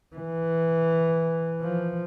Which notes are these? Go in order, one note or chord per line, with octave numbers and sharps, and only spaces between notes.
E3
F3